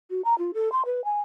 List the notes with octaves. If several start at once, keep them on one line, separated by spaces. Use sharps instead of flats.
F#4
A#5
F4
A4
C6
B4
G#5